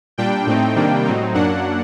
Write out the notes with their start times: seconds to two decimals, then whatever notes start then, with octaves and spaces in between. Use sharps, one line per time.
0.18 A#2 G3 D4 G5
0.47 A2 A3 C4 D#4
0.75 C3 D#3 G3 A#3 D4
1.05 A2 F#3 C4 D#4
1.34 F#2 F#3 A#3 D4 F#5